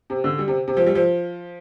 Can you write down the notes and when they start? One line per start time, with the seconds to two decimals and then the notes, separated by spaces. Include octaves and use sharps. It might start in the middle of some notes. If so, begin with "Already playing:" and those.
0.10 C3
0.24 D3
0.38 G3
0.48 C3
0.68 C3
0.77 F3
0.87 G3
0.95 F3